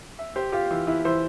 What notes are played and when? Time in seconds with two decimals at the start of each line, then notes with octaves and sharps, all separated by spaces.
0.19 E5
0.36 G4 C5
0.52 F4 G4
0.71 E3
0.87 E3 E4
1.05 E3 C5